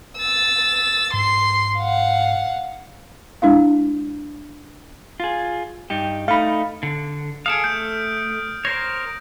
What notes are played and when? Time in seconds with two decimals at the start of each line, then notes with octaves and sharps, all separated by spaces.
0.18 E6 A6
1.13 G#2 C6 C7
1.78 F5 F#5
3.42 G#3 D4 E4 F5
5.20 F4 G#4
5.90 G2 D#4 G4
6.28 A3 D#4 F5 B5
6.83 D3
7.46 G#4 A4 F5 D#6 F6 D7
7.64 A3 G6
8.65 A#4 C5 C#5 A#6